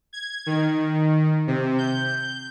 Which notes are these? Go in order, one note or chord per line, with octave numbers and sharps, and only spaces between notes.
G#6
D#3
C3
G6